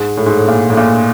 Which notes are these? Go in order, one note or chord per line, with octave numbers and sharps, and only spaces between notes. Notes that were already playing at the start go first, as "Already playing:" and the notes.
Already playing: G#2
A2
G#2
A2
A#2
A2
A#2